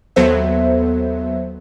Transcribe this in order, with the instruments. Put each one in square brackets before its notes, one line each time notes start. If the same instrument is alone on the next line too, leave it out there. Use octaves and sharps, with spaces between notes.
[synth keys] D#2 F#3 B3 A4 C5 E5